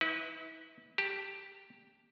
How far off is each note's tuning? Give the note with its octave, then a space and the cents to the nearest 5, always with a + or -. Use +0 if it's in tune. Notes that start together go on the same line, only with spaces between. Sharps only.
E4 -40 B4 +0
G4 +0 A5 +10